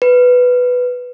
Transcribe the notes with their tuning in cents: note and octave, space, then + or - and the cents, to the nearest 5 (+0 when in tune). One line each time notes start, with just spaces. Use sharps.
B4 +5